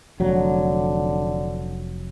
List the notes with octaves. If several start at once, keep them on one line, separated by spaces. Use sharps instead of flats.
F1 D3 F#3